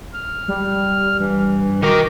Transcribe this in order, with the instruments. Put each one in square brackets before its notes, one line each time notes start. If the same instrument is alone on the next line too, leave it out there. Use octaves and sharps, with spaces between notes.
[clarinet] F6
[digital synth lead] G3
[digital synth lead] G2 [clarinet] E3
[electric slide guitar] D#3 A#4 [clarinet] F#4 [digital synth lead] D6